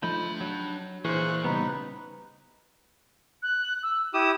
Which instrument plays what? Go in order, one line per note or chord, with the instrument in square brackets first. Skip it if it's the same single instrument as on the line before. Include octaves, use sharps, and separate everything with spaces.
[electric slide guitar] F3 A3 D#4 [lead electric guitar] D4 B5 [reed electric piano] G6
[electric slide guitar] F#3
[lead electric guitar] A#2 [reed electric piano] E3 C5 [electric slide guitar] G#4 [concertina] C#6 F#6
[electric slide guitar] C#3 G3 B3 [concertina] D#4 B4
[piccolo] F#6
E6
[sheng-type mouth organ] E4 G4 D#6 [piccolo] E7